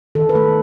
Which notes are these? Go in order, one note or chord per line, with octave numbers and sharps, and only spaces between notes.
D#3 A4
B4
A3 A4